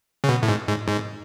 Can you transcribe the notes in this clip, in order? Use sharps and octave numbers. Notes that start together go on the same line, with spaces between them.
C#3
B2
A2
G#2
G#2
G#2